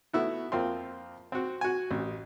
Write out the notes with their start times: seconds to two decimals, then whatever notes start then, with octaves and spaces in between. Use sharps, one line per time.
0.13 A3 B3 E4 F#4
0.52 F2 A#3 C4 F4 G5 C6
1.32 C4 F#4
1.61 F#4 G#5
1.91 A1